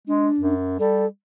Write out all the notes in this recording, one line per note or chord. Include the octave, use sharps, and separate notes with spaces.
G#3 D4
F#2
G3 A4